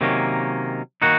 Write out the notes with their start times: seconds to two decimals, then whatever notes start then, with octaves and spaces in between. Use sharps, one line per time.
0.01 C3 D#3 F#3 A#3 C#4
1.02 D#3 A#3 D#4 F#4